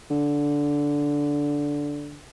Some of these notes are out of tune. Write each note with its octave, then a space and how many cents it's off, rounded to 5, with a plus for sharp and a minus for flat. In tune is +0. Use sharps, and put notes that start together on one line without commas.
D3 -10